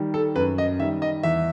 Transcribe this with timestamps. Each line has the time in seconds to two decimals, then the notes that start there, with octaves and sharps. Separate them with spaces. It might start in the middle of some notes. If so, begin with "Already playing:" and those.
Already playing: D#3 G3
0.14 A4
0.36 F#2 B4
0.58 D#5
0.79 D#3 G3 E5
1.02 D#5
1.23 E2 E5